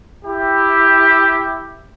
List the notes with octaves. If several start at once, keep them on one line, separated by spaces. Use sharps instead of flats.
E4 G4